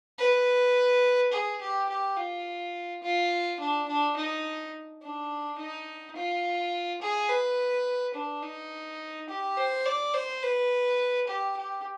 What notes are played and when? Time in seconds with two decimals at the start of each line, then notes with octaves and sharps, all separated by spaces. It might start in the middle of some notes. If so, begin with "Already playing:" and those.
0.18 B4
1.32 G#4
1.61 G4
1.89 G4
2.17 F4
3.03 F4
3.60 D4
3.88 D4
4.17 D#4
5.03 D4
5.58 D#4
6.16 F4
7.02 G#4
7.29 B4
8.15 D4
8.43 D#4
9.29 G4
9.58 C5
9.86 D5
10.14 C5
10.43 B4
11.28 G4
11.57 G4